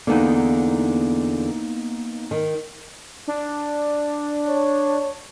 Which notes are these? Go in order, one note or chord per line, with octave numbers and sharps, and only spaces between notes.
E2 D3 A#3 B3 D#4
D#3
D4
C#5